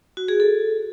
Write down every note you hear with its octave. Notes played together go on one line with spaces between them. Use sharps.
F#4
G#4
A4